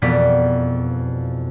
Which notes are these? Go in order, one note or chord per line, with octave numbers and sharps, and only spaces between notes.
E1 F2 B2 B3 D5 B6